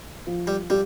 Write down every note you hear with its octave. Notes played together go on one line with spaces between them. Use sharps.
F3
G3
G3 G4